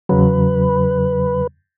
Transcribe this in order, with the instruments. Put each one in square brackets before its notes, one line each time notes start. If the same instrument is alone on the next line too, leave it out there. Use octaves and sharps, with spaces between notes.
[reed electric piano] E2 C#3 F#3 [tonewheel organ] B4